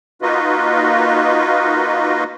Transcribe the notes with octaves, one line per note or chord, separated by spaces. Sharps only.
A#3 D#4 F4 F#4 B4 D#5